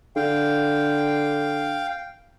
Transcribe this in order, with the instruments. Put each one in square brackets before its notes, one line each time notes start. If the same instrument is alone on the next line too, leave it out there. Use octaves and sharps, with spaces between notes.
[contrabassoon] D3 [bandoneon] F5 G5